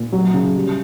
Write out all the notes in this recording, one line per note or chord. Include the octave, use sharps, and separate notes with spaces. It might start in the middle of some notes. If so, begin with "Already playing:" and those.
Already playing: A#2
F#3
C#3
G3